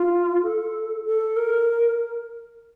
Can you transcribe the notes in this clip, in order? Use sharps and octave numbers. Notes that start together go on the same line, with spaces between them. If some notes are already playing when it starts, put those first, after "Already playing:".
Already playing: F4
A4
A4
A#4